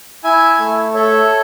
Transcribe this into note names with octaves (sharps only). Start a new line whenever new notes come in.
E4 E5 G#5
A3
A4 C#5 E5